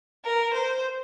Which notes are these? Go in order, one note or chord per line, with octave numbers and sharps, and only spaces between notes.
A#4
C5